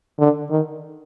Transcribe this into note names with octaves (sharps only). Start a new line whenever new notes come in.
D3
D#3